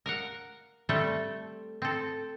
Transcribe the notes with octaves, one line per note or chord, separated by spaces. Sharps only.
A#4 F5 F#5
G3 A3 C4 A4
C4 A4